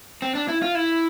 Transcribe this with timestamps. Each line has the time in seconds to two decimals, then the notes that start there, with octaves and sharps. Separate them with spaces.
0.22 C4
0.35 D4
0.48 E4
0.62 F4
0.75 E4